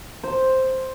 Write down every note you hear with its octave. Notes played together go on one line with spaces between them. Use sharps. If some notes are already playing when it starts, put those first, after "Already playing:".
C5